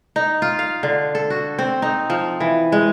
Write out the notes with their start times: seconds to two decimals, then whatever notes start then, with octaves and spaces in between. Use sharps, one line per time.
0.16 D#4
0.42 F4
0.59 F5
0.83 D3
1.15 A4
1.30 F#4
1.58 C4
1.82 D#4
2.10 F3
2.40 E3
2.72 G#3